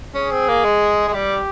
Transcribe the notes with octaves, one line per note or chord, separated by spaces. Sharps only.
C#4 G#4
C4
A#3
G#3
G#3
G3 G4